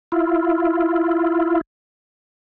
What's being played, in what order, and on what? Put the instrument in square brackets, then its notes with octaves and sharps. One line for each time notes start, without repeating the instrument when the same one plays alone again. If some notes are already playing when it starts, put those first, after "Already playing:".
[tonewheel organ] E4 F4